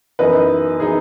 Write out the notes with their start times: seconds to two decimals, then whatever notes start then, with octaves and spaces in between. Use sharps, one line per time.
0.19 F#2 E3 B3 D#4 B4 D#5
0.80 E3 B3 D#4 G#4